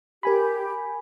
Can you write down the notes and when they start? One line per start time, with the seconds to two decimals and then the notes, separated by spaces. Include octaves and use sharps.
0.23 G4 A#4 G#5 B5